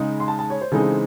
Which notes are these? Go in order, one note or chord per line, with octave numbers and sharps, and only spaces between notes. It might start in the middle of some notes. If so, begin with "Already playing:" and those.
Already playing: C#3 G#3 D#4
C6
A5
A5
C#5
C5
C#3 E3 G#3 C4 D#4 A4